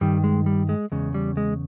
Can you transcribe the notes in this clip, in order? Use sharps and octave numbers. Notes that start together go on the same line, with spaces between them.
G2 D#3 G3
G#3
G3
G#3
E2 C#3 G#3
G3
G#3